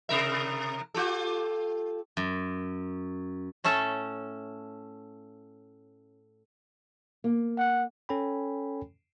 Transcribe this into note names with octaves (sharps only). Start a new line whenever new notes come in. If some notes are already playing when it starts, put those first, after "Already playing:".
C3 A#4 E5
F4 G4 A4
F#2
A2 A3 C#4 A4 E5
A#3
F#5
C#4 A4 C#5 G5 G#5 B5